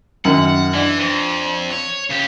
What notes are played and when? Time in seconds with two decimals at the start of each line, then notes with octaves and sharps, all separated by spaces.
0.25 F#2 D#3 F#5
0.74 E3 D4
0.99 F2
1.71 C#5
2.10 C#3 G4